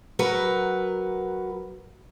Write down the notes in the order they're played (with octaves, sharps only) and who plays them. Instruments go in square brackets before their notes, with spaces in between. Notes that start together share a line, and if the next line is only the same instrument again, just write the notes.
[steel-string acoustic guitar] F#3 F#4 A#4 B4